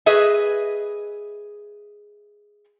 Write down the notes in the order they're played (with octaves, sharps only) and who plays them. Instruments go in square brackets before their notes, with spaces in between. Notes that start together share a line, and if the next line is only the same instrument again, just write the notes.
[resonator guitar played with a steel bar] G#4 B4 D#5 E5